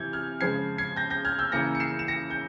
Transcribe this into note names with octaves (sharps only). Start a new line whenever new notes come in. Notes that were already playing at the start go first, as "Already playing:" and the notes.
Already playing: C3 E3 G6 G#6
F6 G#6
C#3 F3 G#3 G#6 C7
G#6 C7
G6 A#6
G6 A#6
F6 G#6
E6 G6
C#3 E3 A#3 A#6 C#7
C#7
C7 E7
E7
A#6 C#7
G6